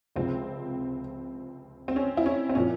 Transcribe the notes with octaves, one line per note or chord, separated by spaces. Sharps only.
C#2 C3 F3 C4
C4
C#4
E4
C#4
C4
A#2 F3 C#4